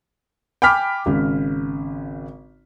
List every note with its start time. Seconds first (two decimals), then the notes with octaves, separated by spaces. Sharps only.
0.62 G5 G#5 B5 D6 F6 B6
1.06 G#1 C#3